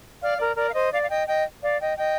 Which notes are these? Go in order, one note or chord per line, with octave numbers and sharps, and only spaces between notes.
D5 F5
A#4 D5
A#4 D5
F5
C5 D#5
D5 F5
F5
D#5 G5
D#5 G5
D5 F5
D#5 G5
D#5 G5